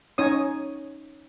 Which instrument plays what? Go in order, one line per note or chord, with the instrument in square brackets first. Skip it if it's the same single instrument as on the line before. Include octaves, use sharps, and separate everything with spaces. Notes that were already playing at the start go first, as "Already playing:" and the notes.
[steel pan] C#4 D#4 C#5 D#6